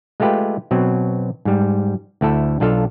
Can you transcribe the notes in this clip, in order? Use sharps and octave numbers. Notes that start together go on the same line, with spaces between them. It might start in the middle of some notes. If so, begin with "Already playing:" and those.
G#3 A3 F4 G4 B4
B2 F#3 C4
G#2 G3
D2 A3 E4 A4
B1 D4 F4 A4 F5